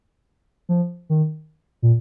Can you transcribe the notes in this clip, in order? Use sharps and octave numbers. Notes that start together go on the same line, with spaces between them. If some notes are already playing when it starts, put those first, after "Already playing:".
F3
D#3
A#2